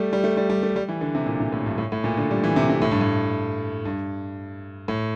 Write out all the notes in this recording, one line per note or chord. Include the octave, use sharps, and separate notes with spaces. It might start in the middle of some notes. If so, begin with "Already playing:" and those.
Already playing: G3 A3
G3
A3
G3
G3
A3
G3
E3
D3
C3
A#2
A#2
A2
G2
A2
A2
A#2
D3
G3
E3
C3
C3
A2
G2
A2
G2
A2